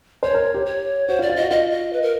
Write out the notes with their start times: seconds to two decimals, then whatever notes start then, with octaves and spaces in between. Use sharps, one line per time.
0.23 C5 C#5
0.34 A#4
0.54 G4
0.66 C#5
1.08 F#4 C5
1.19 F4
1.22 D5
1.29 F4
1.36 F#4 D#5
1.51 F4 D#5
1.72 D#5
1.93 B4
2.02 A#4